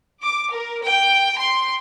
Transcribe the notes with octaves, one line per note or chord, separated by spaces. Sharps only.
D6
A#4
G5
C6